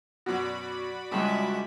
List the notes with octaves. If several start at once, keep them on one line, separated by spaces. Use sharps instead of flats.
F#2 B2 F#4 D5 B5
C#2 G2 G#3 E5